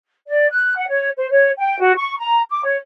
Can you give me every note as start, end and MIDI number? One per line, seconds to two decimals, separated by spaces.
0.27 0.47 74
0.51 0.73 90
0.76 0.85 78
0.89 1.09 73
1.17 1.27 72
1.30 1.50 73
1.58 1.79 79
1.80 1.92 66
1.97 2.15 85
2.18 2.41 82
2.50 2.60 86
2.65 2.76 73